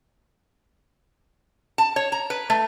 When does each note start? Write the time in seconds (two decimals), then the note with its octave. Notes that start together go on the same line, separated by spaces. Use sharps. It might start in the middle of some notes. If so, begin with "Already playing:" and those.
1.78 A5
1.96 C#5
2.12 A#5
2.30 B4
2.50 A3